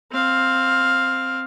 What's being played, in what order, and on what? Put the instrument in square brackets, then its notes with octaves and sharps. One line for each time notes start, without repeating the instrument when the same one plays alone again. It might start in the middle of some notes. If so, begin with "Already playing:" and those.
[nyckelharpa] C4 F5